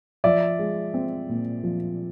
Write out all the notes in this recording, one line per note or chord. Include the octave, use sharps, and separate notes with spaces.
F3 D5 E5
G#3
C4
A#2
F3